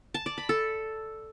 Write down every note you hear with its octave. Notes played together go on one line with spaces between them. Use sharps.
A5
D5
B5
A4